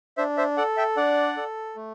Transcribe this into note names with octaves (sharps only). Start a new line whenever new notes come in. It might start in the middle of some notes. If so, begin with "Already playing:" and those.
D4 C5 E5
C5 E5
A4 D5 F#5
E5 G5
D4 D5 F#5
A4
A3